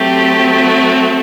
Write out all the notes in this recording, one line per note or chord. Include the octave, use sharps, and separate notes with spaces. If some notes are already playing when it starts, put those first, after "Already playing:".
Already playing: F#3 A3 C4 G4
F#4